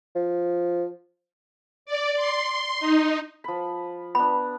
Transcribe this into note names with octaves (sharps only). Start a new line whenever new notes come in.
F3
D5
C6
D#4
F3 B5
B3 D4 B5